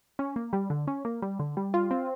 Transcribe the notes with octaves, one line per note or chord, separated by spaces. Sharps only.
C#4
A#3
G3
D3
C#4
A#3
G3
D3
G3
F4
C4